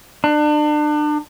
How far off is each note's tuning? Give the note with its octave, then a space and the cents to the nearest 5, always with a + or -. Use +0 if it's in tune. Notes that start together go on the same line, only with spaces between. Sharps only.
D4 +35